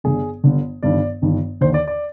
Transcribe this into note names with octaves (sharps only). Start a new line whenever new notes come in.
G1 G2 D3 G#4
G1 G2 D3
G1 G2 D#3 D5
G1 G2 D#3
D#2 D3 C5
D5
D5